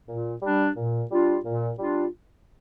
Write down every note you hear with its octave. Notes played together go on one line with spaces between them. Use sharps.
A#2
G3 D4
A#2
G3 D4 F4
A#2
G3 D4 F4